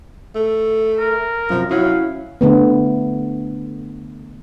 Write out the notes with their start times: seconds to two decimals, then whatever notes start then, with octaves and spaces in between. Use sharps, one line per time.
0.36 A3
1.00 A#4
1.50 F#2 C3 F3
1.71 F#3 C#4 E4 F5
2.41 D3 A3 B3